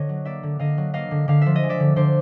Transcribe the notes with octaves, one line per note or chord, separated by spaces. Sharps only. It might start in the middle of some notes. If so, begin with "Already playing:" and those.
Already playing: D3 C#5 D#5
F#3
A#3 D5 E5
D3
D3 D#5 F5
F#3
A#3 D#5 F5
D3
D3 F5
F3 E5
D#5
G#3
D5 E5
D3
D3 C5 D5